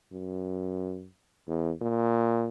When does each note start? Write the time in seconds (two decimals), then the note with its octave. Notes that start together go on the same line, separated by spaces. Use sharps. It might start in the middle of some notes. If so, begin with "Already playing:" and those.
0.12 F#2
1.48 E2
1.81 A#2